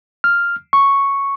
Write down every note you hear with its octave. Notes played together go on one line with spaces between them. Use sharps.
F6
C#6